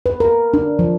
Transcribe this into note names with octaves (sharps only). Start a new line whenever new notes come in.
B4
A#4
D4
F3